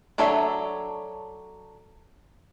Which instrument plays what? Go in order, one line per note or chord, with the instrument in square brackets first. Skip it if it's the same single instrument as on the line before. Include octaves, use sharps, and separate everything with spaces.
[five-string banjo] F#3 D4 A4 C#5 E5